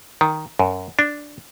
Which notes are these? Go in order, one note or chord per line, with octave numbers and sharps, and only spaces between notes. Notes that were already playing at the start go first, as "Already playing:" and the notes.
D#3
F#2
D4